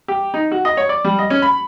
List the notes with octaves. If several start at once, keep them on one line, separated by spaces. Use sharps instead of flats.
G4
D#4
F#4
D#5
C#5
D5
G3
D#5
C#4
B5